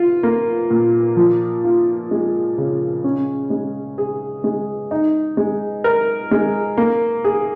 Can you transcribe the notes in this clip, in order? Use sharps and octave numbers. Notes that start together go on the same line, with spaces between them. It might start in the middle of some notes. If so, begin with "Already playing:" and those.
Already playing: F4
A#3
A#2
F3
F4
G#3
C#3
C#4
G#3
G#4
G#3
D#4
G#3
A#4
G#3
A#3
G#4